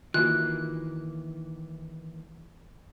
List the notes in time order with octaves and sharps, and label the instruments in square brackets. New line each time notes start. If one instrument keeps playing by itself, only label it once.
[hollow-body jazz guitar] D#3 E3 A#3 [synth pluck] F4 F#4 [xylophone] F#6